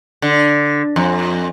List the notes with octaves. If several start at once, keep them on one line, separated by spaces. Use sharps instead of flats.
D3
F2